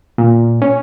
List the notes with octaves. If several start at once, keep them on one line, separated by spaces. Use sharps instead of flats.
A#2
C#4